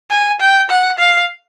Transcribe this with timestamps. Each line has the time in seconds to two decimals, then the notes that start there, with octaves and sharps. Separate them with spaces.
0.10 G#5
0.40 G5
0.70 F#5
0.99 F5